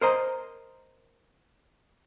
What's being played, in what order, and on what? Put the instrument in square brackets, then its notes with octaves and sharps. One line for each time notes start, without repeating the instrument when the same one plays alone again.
[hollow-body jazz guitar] A#4 C5 D#5 A#5